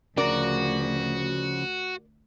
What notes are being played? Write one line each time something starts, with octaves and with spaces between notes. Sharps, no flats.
D2 C#3 F3 F#4 A#4 D5